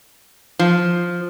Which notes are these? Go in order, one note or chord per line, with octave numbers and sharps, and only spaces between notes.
F3